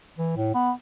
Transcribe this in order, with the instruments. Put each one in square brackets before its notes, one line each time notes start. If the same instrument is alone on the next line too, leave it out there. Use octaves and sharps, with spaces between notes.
[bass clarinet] E3
A2
B3